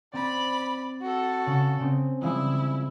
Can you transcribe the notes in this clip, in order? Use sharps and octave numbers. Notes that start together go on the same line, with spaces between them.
C4 D5 B5
F#4 A4
C#3
C#3 C4
F3 G3 G#3 E4